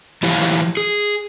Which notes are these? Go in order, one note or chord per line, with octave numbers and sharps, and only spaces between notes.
E3 F3 E4 G4 C#5 F5
G#4